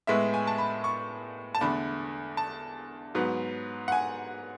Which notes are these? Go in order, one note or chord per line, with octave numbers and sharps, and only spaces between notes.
A2 G#3 B3 E5
G#5
A5
B5
C#6
A5
E2 D3 A3 B5
A5
G#2 F#3 B3
F#5
G#5